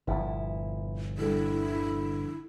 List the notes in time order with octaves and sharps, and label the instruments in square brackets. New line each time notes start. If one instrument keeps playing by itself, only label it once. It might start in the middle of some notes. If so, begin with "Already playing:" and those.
[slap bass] G1 A#2 F3 [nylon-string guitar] E4
[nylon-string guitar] D3 G3 A4 [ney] E4